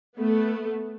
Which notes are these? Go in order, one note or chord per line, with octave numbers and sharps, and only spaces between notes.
A3 B3